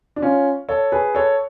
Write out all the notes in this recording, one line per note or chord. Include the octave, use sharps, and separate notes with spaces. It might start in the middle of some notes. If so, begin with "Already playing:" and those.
D4
C#4 F4
A4 C#5
G#4 B4
A4 C#5